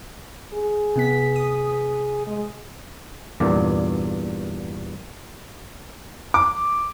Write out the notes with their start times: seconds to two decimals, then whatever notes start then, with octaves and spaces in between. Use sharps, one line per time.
0.54 G#4
0.96 C3 B3 B6
1.36 D#6
2.27 G#3
3.40 E2 G2 A#2 D5
6.34 D6